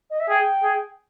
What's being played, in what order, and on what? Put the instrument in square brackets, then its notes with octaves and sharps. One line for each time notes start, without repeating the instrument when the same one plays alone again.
[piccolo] D#5
E5
[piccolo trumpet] G#4 [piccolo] G5
[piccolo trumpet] G#4